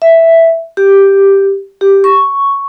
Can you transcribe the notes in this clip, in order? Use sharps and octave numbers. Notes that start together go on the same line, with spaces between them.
E5
G4
G4
C#6